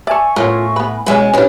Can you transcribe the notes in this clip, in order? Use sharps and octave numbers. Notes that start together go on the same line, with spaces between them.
D5 E5 G#5 A5 C#6
A2 B3 C#4 F4 A#4
B3 B4 B5
B2 G#3 C#4 E4 B4 G#5
A#2 G3 G#3 C#4 D4 E4 B4